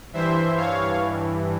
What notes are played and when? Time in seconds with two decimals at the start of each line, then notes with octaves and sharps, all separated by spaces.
0.13 G2 E3 C5 E5
0.57 C#5 F5